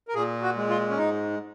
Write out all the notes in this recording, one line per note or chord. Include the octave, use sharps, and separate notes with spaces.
A#4
A#2 G#4
F#4
G#3
F4
C#4
G#2 D#4